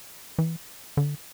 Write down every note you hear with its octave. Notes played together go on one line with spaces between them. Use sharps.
E3
D3